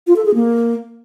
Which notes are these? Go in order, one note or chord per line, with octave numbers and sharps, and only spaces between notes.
F4
A4
G#4
A#3